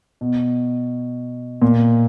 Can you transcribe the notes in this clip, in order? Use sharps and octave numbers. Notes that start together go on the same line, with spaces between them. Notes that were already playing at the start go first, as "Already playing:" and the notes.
B2
A#2